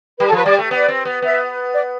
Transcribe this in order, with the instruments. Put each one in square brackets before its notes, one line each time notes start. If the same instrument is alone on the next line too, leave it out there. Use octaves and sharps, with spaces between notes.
[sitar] G3 [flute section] B4
[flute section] A4
[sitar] F3 [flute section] B4
[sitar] G3 [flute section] D5
[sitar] A3
[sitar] B3 [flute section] D5
[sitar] C4
B3
[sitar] B3 [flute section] E5
[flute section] D5